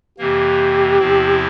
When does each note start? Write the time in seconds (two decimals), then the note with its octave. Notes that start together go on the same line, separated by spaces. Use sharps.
0.18 F2 C3 E3 A#3 G4
0.99 E2 C3 F3 C4 E4